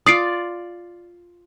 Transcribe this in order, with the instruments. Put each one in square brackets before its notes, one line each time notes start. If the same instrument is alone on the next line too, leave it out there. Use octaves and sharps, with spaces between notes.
[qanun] F4 D5 [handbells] D#6 C7 D7